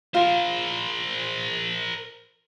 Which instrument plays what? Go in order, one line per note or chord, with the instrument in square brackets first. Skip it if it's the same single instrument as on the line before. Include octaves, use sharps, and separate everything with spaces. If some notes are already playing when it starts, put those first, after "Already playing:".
[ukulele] F4 [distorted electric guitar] A#4 C5